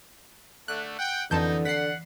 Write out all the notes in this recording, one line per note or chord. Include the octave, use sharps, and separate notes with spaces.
D3 A3 F#6
F#5 G5
F2 B2 D3 E3 D#4 A5 G6
D5 F#5 B6 C7